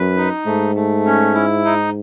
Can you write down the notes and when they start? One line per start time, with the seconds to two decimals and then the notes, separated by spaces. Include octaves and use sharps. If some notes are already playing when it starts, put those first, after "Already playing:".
Already playing: F#2 B4
0.17 D#4
0.46 G#2 A3
0.76 A3
1.06 C#4
1.35 E4
1.65 D#4